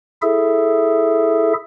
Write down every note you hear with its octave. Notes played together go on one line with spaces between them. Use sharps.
E4 G#4 A4 E5